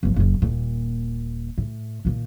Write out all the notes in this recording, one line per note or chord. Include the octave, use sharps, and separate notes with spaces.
G1 F3
F#1 F#2
D#1 A#2
A2
A#2 D#3